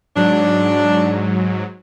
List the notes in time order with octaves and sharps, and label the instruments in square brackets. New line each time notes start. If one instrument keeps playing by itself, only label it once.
[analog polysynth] G#2 F#3 [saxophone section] D4